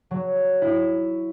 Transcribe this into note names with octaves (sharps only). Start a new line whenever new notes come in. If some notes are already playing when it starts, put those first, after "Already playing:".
F#3
E4